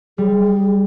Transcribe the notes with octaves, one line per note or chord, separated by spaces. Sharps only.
G3 G#4